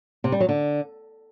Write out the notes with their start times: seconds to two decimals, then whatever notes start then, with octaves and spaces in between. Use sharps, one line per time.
0.24 C3
0.32 G3
0.40 F#3
0.49 D3